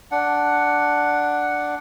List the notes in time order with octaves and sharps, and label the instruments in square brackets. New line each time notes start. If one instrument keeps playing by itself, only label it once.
[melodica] D4 F#5